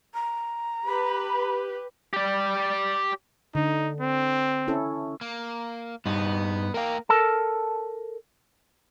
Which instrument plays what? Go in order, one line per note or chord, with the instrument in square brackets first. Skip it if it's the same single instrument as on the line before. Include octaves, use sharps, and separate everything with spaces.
[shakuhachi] A#5
[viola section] G4 B4 [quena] B5
[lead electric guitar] G4 D5
[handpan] D3 [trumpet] D#4
[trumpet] C4
[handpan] C#4 E4 A4
[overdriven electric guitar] A#3
[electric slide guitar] G2 D#4 [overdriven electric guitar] B3
[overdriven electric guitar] A#3 G5 [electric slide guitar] A#4 F5
[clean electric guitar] A4 A#4 A5